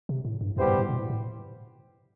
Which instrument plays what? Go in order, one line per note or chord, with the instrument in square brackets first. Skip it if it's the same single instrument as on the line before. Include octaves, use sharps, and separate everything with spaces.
[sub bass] C3
A2
G2
[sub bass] F2 [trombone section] G3 B3 E4 G4 C5
[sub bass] G2
A2
B2
A2
A2